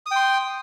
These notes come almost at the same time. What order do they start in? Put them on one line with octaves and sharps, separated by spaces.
D#6 G5 C6